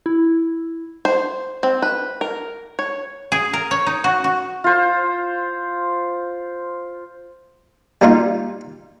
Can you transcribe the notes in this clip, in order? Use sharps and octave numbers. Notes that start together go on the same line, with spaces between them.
E4
C5
C4
B4
A#4
C#5
G#4
A#4
C#5
D#4
F#4
F#4
F4 C5
G3 A#3 D#4 F4